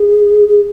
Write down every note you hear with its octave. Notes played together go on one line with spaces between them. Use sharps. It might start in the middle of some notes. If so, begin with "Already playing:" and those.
Already playing: G#4
G#4